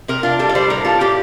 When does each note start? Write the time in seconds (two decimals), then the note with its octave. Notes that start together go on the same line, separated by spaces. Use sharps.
0.08 C3 A#4
0.23 D4 F4
0.39 G3 A4
0.49 D5
0.55 G3 C5
0.70 A2 A#4
0.85 F4 A4
1.00 A2 G4